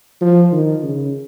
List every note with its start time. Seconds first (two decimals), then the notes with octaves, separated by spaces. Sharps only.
0.21 F3
0.52 D#3
0.83 C#3